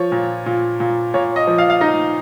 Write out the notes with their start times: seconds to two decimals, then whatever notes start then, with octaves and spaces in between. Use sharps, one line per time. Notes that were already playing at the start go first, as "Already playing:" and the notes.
Already playing: F3 C#5
0.12 A#2
0.46 A#2
0.80 A#2
1.14 A#2 C#5
1.36 D#5
1.47 F3
1.58 F5
1.70 F5
1.81 D#4 D#5